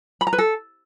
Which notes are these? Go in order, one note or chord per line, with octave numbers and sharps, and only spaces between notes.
B5
A#5
B4
A4